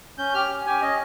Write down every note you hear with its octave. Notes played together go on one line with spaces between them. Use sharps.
C#4 G6
G4 F6
C#4
G4 G#5
C#4 D#5